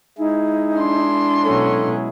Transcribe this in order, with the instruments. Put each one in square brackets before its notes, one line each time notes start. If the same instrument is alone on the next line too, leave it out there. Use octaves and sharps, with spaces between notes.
[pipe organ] G#3 E4 G#4 [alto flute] D#4
[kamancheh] D4 C6
[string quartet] B2 F#3 C#4 [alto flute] A4